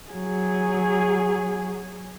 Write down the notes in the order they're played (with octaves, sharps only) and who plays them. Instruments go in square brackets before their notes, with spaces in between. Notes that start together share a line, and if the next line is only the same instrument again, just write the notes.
[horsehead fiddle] F#3 G#4